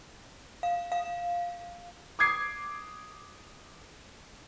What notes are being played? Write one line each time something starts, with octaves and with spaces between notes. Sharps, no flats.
F5
F5
D6 D#6 G#6 C7